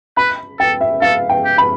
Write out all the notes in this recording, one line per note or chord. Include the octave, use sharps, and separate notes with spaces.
B4 B5
A4 G5
E5
A4 F5
G5
G4
B5